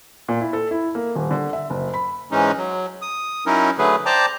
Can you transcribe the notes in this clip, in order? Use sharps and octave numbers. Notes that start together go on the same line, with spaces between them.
A#2
E4
A4
E4
A#3
D#1
D3
E5
F#1
B5
G#2 E3 G#3 C#4 D#4
F#3
D#6
F#3 C#4 D#4 E4 A#4
D3 F#3 A3 G#4 B4
C5 D5 G5 A5 A#5 D6